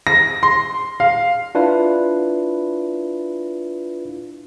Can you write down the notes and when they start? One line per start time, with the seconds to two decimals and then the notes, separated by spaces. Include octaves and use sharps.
0.07 A#6
0.43 C6
1.00 F5
1.55 D4 E4 F4 B4